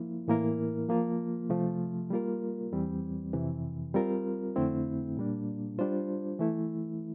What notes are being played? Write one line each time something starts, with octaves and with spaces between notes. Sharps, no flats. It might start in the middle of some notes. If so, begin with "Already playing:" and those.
Already playing: F3 A#3 E4
A2 E3 A#3 E4 A#4
F3 A#3 F4
C3 F3 A3
G3 A#3 F4 A#4
E2 E3 G3 C4
F2 C3 E3
G3 C4 F4 A#4
F2 D3 A3 C4 E4
A#2 G3 A#3 D4
G3 D4 F4 C5
E3 A3 E4